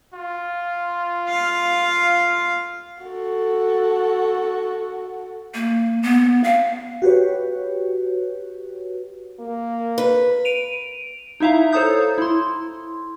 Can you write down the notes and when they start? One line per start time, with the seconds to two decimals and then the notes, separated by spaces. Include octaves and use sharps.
0.14 F4
1.29 F5
3.04 F#4 A4
5.54 A#3
6.03 B3
6.44 F5
7.02 F#4 G4 B4 C#5
9.40 A#3
9.98 B4
10.45 D7 D#7 F7
11.40 D#4 E4 E5 F5 A#5
11.72 A4 C5 C#5 A#5 D#6 G6
12.18 E4 C6